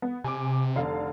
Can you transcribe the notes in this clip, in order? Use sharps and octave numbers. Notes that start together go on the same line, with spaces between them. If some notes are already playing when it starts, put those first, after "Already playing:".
B3
C3 G#5 D6
F1 D3 F5